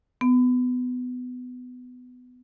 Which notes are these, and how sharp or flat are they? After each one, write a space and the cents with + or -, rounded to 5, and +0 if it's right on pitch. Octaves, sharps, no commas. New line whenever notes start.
B3 +20